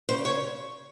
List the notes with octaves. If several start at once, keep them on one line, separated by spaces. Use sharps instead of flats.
C#3 C5
C#5